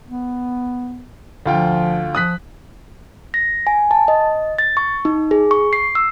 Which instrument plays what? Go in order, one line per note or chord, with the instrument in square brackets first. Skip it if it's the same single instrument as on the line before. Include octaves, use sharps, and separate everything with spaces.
[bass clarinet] B3
[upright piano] D2 F4 G5 [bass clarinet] F3
[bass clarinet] F3 [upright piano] D#6 F#6 B6
[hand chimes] A#6
G#5
A5
D#5
A6
C#6
D#4
G#4
C#6
C7
E6